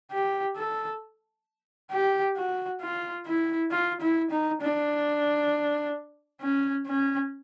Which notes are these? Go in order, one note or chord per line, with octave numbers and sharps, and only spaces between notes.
G4
A4
G4
F#4
F4
E4
F4
E4
D#4
D4
C#4
C#4